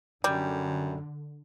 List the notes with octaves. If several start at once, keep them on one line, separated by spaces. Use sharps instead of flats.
F#2 D3 G3